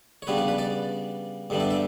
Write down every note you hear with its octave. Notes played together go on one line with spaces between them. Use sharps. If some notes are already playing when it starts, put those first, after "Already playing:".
C#5
C#3 G3 B3 D4 B4
B4
B4
D5
G2 D3 G3 B3 D4
E5
E5